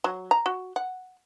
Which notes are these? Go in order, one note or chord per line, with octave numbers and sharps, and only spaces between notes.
F#3
A#5
F#4
F#5